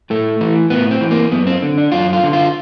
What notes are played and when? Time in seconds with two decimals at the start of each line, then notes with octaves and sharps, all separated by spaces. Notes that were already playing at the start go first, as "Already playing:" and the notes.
0.10 A2 A3
0.41 E3
0.70 A2 B3
0.91 C4
1.01 E3
1.11 A#3
1.31 F#2 B3
1.47 C4
1.63 D3
1.78 D4
1.92 F#2 F4
2.13 F4
2.23 D3
2.33 F4